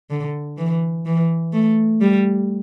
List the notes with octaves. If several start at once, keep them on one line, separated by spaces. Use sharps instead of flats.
D3
E3
E3
A3
G3